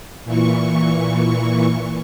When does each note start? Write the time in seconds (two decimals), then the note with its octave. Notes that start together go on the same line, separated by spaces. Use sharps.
0.24 A#2 E3 C#6